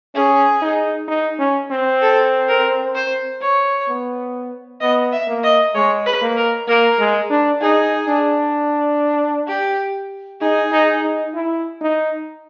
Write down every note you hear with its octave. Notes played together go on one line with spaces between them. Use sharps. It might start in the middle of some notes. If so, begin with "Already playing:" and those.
C#4 G#4
D#4
D#4
C#4
C4
A4
A#4
C5
C#5
B3
B3 D#5
E5
A#3
D#5
G#3 C#5
B4
A#3
A#4
A#3 A#4
G#3
D4
D#4 G#4
D4
G4
D#4 G#4
D#4
D#4
E4
D#4